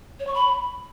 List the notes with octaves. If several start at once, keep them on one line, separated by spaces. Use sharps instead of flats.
C#5
C#6
B5